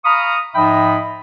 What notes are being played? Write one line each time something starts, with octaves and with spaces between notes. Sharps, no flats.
F5 A#5 B5 C#6 D#6
G#2 F3 D#5 E5 G5 B5